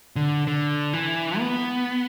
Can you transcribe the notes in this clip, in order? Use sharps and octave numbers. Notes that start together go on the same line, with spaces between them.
D3
D3
E3
B3